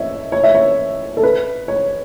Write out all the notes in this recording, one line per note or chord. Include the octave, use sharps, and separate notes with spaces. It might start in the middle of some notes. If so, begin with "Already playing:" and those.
Already playing: C#5 E5
C#5
E5
C#5
A4
B4
C#5